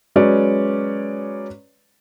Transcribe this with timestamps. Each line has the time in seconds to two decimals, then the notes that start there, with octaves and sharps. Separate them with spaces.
0.16 F#3 G#3 C#4 B4 C#5 D5